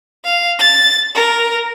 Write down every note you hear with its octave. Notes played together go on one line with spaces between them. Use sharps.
F5
A6
A#4